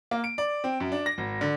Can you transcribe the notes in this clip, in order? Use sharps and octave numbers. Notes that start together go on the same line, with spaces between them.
A#3
D7
D5
C4
F#2
D4
A#6
G#1
D3